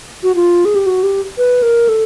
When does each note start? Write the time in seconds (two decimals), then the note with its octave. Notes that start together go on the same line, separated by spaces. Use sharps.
0.23 F#4
0.35 F4
0.65 G#4
0.75 G4
0.86 F#4
1.03 G4
1.38 B4
1.62 A#4
1.88 A4